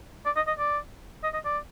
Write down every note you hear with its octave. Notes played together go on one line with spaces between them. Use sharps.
D5
D#5
D#5
D5
D#5
D#5
D5